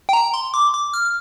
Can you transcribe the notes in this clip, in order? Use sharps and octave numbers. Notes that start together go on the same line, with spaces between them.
G5
A#5
C6
D6
D6
F6